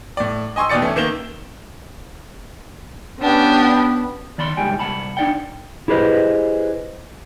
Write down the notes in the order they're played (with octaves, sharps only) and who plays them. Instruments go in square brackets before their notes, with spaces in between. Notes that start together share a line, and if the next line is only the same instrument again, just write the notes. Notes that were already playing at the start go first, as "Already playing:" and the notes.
[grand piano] A2 D5
D#5 G#5 C6 C#6 E6
D#2 B2 D5 A6 C#7
E3 A3 C#4
D#3 A#3 E7 G7
[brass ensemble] B3 [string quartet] C#4 D4 G4
[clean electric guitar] D#3 D5 B5 C6
C#2 A2 G3 G#3 G5 G#5
C2 F#5 A5 B5
D4 D#4 D5 F#5 G5
[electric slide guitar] E4 G4 G#4 B4 C5 D#5